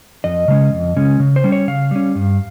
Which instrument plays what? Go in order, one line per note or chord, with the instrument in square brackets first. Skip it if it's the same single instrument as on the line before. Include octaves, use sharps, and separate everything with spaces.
[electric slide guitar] F2 D#5
C#3 G#3 C#4
F2
C#3 G#3 C#4
C#3
C5
G3 C#4
C#5
C#3 F5
G3 C#4
G2